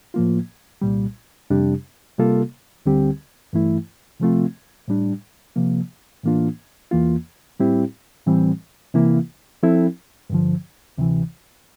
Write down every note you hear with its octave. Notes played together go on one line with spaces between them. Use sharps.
A2 F3 A#3 F4
C2 A#2 G3
F2 C3 G3 D4 G4
C3 G3 A#3 F4 A4
D2 D3 G3 C4 G4
G2 E3 A3 E4
C3 F3 A3 C4 F4
A2 G3 D4
C3 F3 A#3
A2 E3 A#3 D4 F4
E2 E3 A#3 F4
A2 G3 C4 E4 G4
A2 E3 G3 C4
C3 E3 A#3 E4
F3 C4 E4 A4
G2 D3 F3
D2 C3 E3